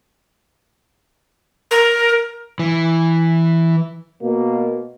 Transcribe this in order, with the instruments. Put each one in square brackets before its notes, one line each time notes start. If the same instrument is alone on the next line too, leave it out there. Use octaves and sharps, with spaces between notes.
[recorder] A#4
[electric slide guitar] E3
[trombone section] B2 A#3